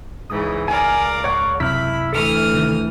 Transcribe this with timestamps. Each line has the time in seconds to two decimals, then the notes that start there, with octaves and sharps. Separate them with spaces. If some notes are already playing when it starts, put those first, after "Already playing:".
0.30 C#2 G#2 C#3 E3 D#6
0.68 A#4 D5 F5 G#5
1.24 G#2 C#5 F#5
1.60 F#2 C3 E4 B5 F6 B6
2.13 D2 E3 A4 D#6 F6
2.53 C3 D#3